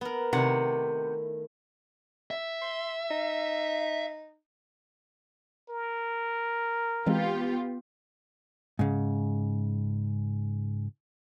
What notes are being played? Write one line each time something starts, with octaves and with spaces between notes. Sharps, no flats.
B3 A#4
C3 D#3 A3 E4 F#5
E5
C6
D#4
A#4
E3 G#3 B3 C4 F4 G4
G#2 C#3